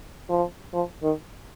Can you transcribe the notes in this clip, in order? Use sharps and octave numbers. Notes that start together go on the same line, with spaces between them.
F3
F3
D#3